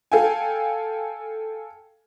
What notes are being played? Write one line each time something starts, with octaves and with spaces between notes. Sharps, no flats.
A4 F5 G5 G#5